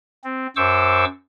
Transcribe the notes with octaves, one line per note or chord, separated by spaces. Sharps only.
C4
F#2 C5 C#6 D6 E6